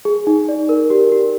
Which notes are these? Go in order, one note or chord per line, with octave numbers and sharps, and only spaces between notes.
G#4
D#4
D5
A#4
G4
G4